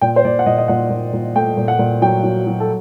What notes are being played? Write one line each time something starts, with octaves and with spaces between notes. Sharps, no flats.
A#2 G5
C5
A#2 D5
F#5
A#2 D#5
D#5
A#2 F#5
A#2
A#2
A3 G5
A#2
F#5
A#2
F#3 G5
F#3
F#3
A4